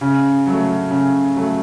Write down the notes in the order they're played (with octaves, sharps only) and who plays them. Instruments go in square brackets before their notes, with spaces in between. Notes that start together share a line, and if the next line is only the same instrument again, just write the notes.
[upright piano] C#3
F#3 A3
C#3
F#3 A3